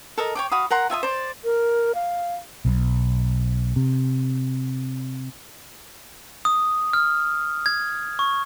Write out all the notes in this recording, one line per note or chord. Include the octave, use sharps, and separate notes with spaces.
A4 A#4 D#5
C#5 G5 D6
F#4 F5 B5 D#6
A#4 F#5 A#5 C6
F4 E5 G#5 D#6
C5 D5
A#4
F5
B1
C3
D#6
F6
G#6
C#6